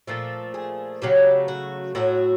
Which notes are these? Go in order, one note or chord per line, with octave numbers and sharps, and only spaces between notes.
A#2 F3 A3 A4
G#4
C#3 F#3 A3 G4
F#4
A2 F#3 A3 F#4